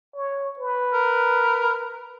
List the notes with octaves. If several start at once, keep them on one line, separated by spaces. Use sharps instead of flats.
C#5
B4
A#4